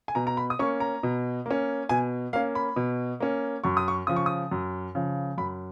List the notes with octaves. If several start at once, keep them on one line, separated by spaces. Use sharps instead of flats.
G#5
B2 A#5
A#5
B5
D#6
A#3 C#4 C#6
A#5
B2
A#3 C#4
B2 G#5
A#3 C#4 F5
B5
B2
A#3 C#4
F#2 C#6
D#6
C#6
C#3 F3 D#6
C#6
D#6
F#2
C#3 F3
F#2 B5